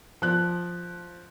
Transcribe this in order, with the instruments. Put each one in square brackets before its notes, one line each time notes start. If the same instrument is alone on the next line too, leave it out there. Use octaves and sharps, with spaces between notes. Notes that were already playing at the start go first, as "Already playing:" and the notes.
[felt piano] F3 F#6